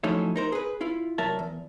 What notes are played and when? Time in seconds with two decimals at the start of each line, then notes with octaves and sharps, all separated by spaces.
0.04 F3 F#3 A3 C#4 D#4 E4
0.36 D#4 A#4 C5
0.52 G#4 B4
0.81 E4 F4
1.18 C2 F#3 A#4 E5 A5
1.39 E2